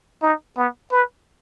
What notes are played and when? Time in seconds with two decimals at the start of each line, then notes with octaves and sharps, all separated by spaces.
0.22 D#4
0.57 B3
0.92 B4